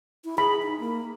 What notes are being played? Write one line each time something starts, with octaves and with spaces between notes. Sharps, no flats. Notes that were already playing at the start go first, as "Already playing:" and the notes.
E4
G#4 B5
D#4
A#3